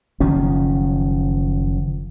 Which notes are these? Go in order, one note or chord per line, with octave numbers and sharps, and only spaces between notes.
F#1 D#3 F3 C#4